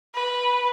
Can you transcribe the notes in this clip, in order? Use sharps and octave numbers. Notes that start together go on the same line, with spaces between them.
B4